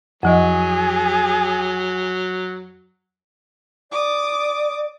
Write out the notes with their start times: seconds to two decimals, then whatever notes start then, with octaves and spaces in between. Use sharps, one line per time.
0.23 F2 F3 F#3 G#4 D#5
3.92 D5 D6 D#6